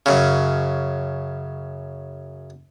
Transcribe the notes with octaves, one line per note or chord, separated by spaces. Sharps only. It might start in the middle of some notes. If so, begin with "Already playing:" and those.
F#2 C#3